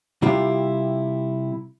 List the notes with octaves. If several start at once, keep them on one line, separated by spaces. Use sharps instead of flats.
C3 G3 E4 F4 G4